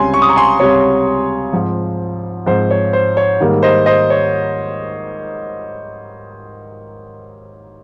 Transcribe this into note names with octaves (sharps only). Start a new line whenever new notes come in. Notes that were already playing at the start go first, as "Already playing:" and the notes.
Already playing: C#2 C3 G3 C#4 G#5 C6
C#6
D#6
A#5 C#6
G#5 C6
C#2 C3 G3 C#4 C#5
G#2 F3 C4
G#2 F3 C4 C5
C#5
C5
C#5
G#2 D#3 G3 A#3
C5 D#5
C5 D#5
C#5